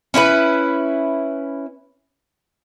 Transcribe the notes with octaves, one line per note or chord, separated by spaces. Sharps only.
C#4 E4 A4 B4